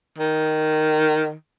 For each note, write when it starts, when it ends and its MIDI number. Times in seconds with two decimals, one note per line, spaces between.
0.18 1.33 51